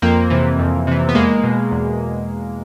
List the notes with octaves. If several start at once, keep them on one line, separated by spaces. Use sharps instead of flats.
F2 A#3 C4
C3 E3
F2
C3 E3
B3
E2 G#3 A#3
B2
E2